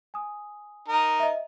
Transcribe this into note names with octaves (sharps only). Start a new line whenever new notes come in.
G#5 D#6
D#4 A#4
D#5 E5